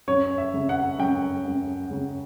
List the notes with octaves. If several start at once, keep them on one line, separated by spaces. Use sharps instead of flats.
F#2 C#5
E5
C#3
F#5
F#2 G5
F#2
C#3